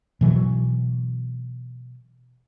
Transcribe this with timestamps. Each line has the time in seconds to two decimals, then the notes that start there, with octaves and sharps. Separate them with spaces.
0.21 B2 E3 F#3